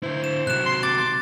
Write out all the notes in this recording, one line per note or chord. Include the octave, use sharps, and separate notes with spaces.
D3 E4 C5
E7
C3 F#3 F#6 E7
C6
D6 A6